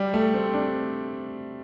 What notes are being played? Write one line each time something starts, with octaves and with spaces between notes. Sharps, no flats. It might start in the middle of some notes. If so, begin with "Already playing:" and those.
Already playing: G3
A3
C4
D4